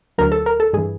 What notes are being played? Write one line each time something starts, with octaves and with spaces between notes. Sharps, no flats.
D2 D3 F#3 A#4
A4
A#4
A4
G2 E3 G#4